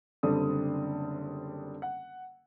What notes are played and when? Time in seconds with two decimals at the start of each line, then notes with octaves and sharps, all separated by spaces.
0.23 F#1 D3 G3 C4 A4 D#6
1.82 F#5